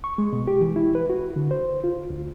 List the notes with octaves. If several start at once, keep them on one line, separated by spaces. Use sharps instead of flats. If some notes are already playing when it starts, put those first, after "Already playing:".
C#6
G#3
B2
G4
E3
E4
B4
F#4
D3
C5
F4
D2